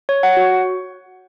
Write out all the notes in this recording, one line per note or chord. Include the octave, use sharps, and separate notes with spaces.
C#5
F#5
F#4